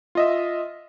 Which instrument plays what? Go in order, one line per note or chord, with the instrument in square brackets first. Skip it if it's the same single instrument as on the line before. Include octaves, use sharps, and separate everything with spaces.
[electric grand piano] F4 D#5 E5